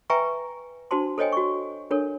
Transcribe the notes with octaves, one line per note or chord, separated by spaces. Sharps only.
B4 E5 G5 G#5 A#5 C#6
D4 F#4 C5 A5 C6
A4 C5 C#5 D#5 G5 G#5
F#4 C#6
D4 A4 A#4 C#5